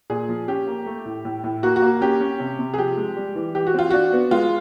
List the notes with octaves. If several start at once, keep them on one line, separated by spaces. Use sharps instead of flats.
A#2 G#4
F3
C#4 G4
A#3
A3
A2
A2
A2
A#3 F#4
F#4
A#3
C#4 G4
C#4
C3
C3
G#4
F3 G4
G#3
G3
E3
E3 G4
F#4
C4 F4
D4 F#4
B3
G#3 F4